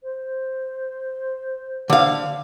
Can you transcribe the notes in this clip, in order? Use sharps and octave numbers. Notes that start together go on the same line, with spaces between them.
C5
D3 F5